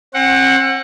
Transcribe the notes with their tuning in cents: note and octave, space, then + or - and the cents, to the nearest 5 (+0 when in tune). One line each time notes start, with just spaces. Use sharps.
C4 +40 F#5 +0